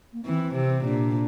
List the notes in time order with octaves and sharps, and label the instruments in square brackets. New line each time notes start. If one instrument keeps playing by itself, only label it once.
[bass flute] A#3
[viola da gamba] E3 [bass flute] C4
[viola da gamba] C3
[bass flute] C4
[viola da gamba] A#2 [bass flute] D4